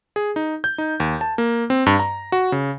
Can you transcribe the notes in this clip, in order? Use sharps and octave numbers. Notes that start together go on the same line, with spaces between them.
G#4
D#4
G6
D#4
D#2
A5
A#3
C4
G2
A#5
F#4
C#3